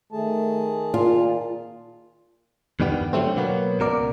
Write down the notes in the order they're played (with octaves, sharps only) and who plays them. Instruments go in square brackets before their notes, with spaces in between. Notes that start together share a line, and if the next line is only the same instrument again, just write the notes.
[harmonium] D#3 G#4 A5 [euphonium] A3
[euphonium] A#2 [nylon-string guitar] F4
[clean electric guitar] E2 G2 D#3 G3 B3
D3 F#3 G3 A3 C4
B2 F#3 A#3 B3
C#2 B2 A#4 D5